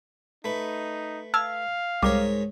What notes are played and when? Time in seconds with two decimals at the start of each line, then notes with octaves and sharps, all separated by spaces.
0.44 A3 D#4 B4
1.34 F5 A5 E6 F6 G#6
2.03 C2 G#2 G3 A#4 C#5 D6